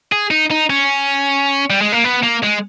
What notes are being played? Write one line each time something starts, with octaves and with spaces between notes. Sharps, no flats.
G#4
D#4
D#4
C#4
G3
G#3
A#3
B3
A#3
G#3